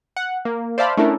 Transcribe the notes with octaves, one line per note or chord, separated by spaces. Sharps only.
F#5
A#3
C5 D5 E5 F5 A5 B5
A3 C#4 D4 E4 A4 A#4